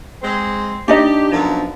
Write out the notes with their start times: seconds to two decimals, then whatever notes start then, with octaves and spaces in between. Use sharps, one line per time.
0.22 G#3 C4
0.88 D4 D#4 G4 D#5
1.31 F#2 B2 F3